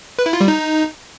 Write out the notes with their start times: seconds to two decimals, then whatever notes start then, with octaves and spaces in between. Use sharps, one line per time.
0.19 B4
0.26 E4
0.33 F4
0.41 G3
0.48 D#4